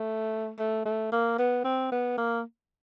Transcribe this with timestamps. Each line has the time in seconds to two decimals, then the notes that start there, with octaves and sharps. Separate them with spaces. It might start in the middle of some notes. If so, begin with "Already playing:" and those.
Already playing: A3
0.59 A3
0.85 A3
1.12 A#3
1.38 B3
1.64 C4
1.92 B3
2.18 A#3